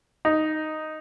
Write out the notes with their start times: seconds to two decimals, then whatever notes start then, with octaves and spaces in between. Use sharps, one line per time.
0.25 D#4